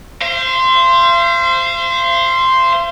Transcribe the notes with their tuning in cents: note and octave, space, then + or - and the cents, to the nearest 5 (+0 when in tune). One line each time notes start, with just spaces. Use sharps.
C5 +0 F5 -45